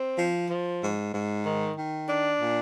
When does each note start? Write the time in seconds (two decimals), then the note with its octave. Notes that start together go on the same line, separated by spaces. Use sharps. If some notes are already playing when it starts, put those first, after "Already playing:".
Already playing: C4
0.18 F3
0.50 F3
0.83 G#2
1.14 G#2
1.46 D#3
1.78 D#3
2.09 D4
2.41 A#2